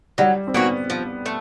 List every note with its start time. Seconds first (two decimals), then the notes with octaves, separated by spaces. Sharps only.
0.18 F#3 G3
0.47 C4
0.54 A#3 B3 C#4 F#4
0.90 F3
1.26 A3